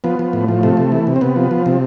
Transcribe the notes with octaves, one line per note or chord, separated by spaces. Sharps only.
F3 B3
F3
A2
F3
C3 A3
C3
E3
C3
C4
C3 B3
F3
F3
C3